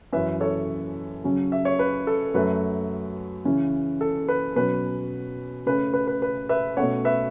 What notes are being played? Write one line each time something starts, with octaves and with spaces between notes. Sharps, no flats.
F#2 E3 C#4 B4 E5
A4 C#5
C#3 F#3 C#4
E5
C#5
B4
A4
F#2 F#3 A3 B4
C#3 E3 C#4
A4
B4
B2 F#3 C#4 B4
C#3 A3 C#4 B4
B4
B4
B4
B4 E5
B2 A3 C#4 C#5 F#5
B4 E5